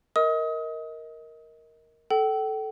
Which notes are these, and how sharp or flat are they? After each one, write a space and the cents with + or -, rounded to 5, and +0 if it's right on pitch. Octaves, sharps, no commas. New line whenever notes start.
A#4 +0 D#5 +25 D#6 +30
A4 -10 G5 -40